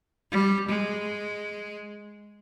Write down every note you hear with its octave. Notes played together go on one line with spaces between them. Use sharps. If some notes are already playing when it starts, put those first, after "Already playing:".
G3
G#3